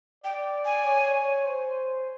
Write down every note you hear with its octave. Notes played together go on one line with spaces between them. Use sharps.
D5 G5
G#5
C#5
C5